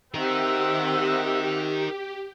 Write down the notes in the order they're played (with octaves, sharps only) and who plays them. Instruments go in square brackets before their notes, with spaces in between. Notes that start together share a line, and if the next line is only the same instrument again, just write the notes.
[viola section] C4 E5 F#5 [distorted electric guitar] D#4 A#4 [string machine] G4